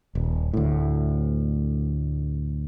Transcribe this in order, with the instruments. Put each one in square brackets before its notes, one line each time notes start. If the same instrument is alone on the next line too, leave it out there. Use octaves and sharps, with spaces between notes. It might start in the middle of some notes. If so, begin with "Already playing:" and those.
[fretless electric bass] D#1
D2 A2